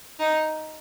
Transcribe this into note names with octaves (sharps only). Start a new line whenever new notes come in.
D#4